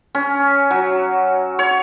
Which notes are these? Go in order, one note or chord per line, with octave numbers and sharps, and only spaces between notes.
C#4
F#3
C#5